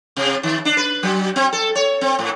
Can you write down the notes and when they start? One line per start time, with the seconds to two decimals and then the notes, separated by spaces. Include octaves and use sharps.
0.17 C3
0.43 D#3
0.65 D4
0.77 B4
1.03 F#3
1.36 C4
1.53 A4
1.75 C#5
2.01 C4
2.19 A2